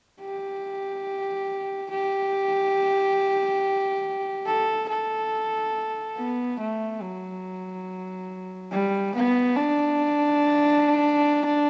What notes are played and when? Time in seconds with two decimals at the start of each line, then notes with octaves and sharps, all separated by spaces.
0.21 G4
1.90 G4
4.46 A4
4.89 A4
6.17 B3
6.60 A3
7.01 F#3
8.71 G3
9.15 B3
9.56 D4